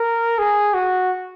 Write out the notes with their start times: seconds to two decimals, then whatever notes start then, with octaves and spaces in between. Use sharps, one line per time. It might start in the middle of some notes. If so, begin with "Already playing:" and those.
Already playing: A#4
0.39 G#4
0.74 F#4